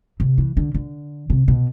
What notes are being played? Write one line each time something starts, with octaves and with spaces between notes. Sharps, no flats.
C3
E3
D3
D3
C3
B2